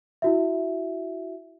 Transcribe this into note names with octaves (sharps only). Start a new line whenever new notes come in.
E4 F#4 E5